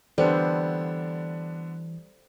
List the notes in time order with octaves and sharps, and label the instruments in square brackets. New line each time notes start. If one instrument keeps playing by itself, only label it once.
[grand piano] D3 B3 D4 [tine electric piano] E3 [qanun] G3 [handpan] A4 C5